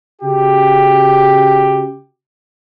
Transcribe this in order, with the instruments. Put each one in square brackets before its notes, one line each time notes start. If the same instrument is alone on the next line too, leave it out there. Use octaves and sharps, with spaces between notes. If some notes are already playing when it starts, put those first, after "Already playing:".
[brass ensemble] C#3 F#4 G4